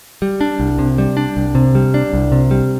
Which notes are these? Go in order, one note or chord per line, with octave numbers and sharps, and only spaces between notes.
G3
D4
C2
C3
G3
D4
C2
C3
G3
D4
C2
C3
G3